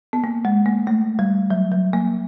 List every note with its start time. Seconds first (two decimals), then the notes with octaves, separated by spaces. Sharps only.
0.13 B3
0.24 A#3
0.45 G#3
0.66 A#3
0.87 A3
1.19 G3
1.50 F#3
1.72 F#3
1.93 A#3